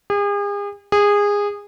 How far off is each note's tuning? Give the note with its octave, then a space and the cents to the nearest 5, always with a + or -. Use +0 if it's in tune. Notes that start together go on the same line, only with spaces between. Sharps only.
G#4 -40
G#4 -20